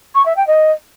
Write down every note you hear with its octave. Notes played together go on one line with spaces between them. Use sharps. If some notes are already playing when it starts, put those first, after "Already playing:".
C#6
E5
G5
D#5